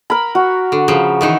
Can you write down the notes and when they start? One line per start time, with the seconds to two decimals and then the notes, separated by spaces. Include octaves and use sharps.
0.10 A#4 B5
0.35 F#4
0.72 D3
0.88 C#3 F3
1.21 D#3 E3 D#4